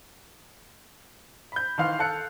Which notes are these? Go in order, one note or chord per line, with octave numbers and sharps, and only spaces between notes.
B5 G6
D#3 E3 F5 C6 F6
A4 F5 A5 F#6 C#7